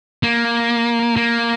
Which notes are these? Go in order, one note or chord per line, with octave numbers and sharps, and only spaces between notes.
A#3
A#3